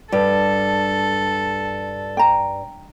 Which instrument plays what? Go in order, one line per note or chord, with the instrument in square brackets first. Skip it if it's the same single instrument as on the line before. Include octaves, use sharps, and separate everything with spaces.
[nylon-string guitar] G2 [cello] A4
[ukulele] G5 A#5